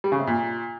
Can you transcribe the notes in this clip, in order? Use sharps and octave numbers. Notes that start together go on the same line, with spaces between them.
G3
C#3
C3
A#2